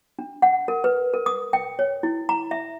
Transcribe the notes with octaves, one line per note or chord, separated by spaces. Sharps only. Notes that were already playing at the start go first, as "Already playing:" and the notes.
D4
F#5
A#4
B4
A#4
D#6
G5
C#5
E4
A#5
E5